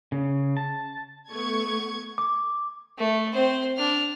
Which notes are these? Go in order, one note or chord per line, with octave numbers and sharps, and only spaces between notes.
C#3
A5
A3 B3 C#6 G#6
D6
A3
C4 C5
D4 F6